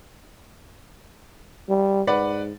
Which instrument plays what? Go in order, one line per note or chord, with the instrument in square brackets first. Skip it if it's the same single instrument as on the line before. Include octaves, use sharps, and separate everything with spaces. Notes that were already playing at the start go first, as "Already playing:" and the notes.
[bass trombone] G3
[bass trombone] G#2 [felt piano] B4 D5 F#5